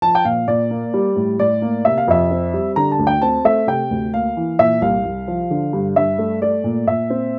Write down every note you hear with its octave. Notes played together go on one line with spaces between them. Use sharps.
F3 A5
G5
A#2 F5
A#2 D5
A#3
G3
A2
A2 D5
A#3
C3 E5
F5
F2 E5
C4
G3
D3 A#5
A5
D2
G5
C4 A5
A3 E5
C3 G5
D2
A#3 F5
E3
A#2 E5
C2 F5
C2
F3
D3
G2
G2 E5
A3
A3 D5
A#2
A#2 E5
C4